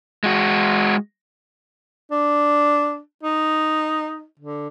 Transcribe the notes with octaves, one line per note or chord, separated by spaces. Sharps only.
G#3 F#4
D4
D#4
D3